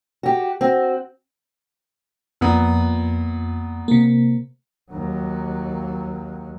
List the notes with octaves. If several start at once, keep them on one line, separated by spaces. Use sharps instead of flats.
F#4 G4
C4 F#4
F2 A#2 B3
C3 A#3
D#2 F#3